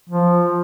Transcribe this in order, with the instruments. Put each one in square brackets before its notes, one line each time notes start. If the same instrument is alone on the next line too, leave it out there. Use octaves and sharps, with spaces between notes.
[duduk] F3